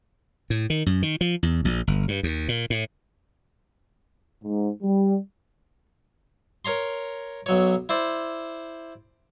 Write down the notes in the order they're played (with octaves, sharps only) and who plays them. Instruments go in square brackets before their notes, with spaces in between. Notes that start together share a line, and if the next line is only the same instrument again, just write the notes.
[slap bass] A2
D#3
F#2
D#3
F3
E2
A#1
G1
G2
D#2
A#2
A2
[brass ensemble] G#2
G3
[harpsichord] A#4 C#5 A#5 C6
B1 F#3 C#5
E4 C5 D5